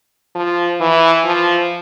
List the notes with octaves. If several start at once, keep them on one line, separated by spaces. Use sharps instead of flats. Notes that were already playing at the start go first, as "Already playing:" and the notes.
F3
E3
F3